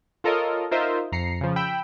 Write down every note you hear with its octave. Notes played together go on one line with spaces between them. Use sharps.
F4 A4 A#4 C#5 D#5
D#4 F4 A#4 C5 D#5 E5
F2 A#5 C7 C#7
C#3 F3
G5 B5 E6